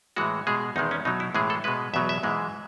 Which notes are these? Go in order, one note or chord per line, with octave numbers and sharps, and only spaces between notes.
A2 E3 G#3 F#4
B2 G#3 G#4
E2 D#3 G#3 D#4
C#4
B2 F#3 D#4
E4
A2 E3 G#3 G#4
A4
B2 G#3 B4
E2 B2 F#3 E5
E5
G#2 E3 G#3